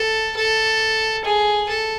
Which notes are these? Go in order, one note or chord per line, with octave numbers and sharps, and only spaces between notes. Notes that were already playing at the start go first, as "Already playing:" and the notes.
Already playing: A4
A4
G#4
A4